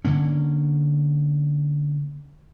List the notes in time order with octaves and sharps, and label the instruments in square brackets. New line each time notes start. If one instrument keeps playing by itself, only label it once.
[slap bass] D3 A#3 C#4